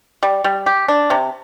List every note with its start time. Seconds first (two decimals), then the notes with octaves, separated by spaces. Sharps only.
0.23 G3
0.44 G3
0.66 G4
0.88 D4
1.10 C3